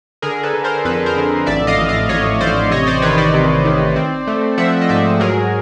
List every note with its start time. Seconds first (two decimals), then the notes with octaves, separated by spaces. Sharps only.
0.22 D3 G#4 A#4
0.43 A4 B4
0.53 D3
0.64 A#4 C5
0.85 F2 A4 B4
1.06 A#4 C5
1.16 D3
1.46 A1 D5 E5
1.67 D#5 F5
1.78 A1
1.89 D#5 F5
2.09 A1 C#5 D#5
2.41 A1 C5 D5
2.71 C3 C#5 D#5
2.87 C5 D5
3.02 D#3 B4 C#5
3.18 C5 D5
3.34 C3
3.65 D#3
3.96 C4
4.27 A3
4.58 F3 E5 F#5
4.81 D#5
4.89 G#2 D5 E5
5.20 F#3 G#4 A#4